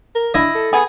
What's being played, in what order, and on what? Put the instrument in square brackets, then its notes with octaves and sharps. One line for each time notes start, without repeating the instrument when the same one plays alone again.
[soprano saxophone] A#4
[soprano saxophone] D4 [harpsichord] E4 D#5
[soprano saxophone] A4
[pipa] B3 G#4